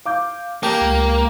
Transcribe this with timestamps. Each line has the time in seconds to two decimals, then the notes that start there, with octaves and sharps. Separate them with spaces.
0.05 F5 D6 G6
0.63 A#3 G4 A5
0.81 C#2